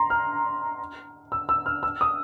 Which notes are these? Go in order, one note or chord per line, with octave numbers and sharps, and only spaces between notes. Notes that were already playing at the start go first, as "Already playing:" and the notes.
Already playing: A#5 C6
F6
E6
E6
F6
E6
D#6